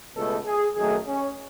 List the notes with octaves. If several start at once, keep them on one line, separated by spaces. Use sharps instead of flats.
C#2 B2 A3 A4
G#4
F#2 D#3 A3 G#4
C#4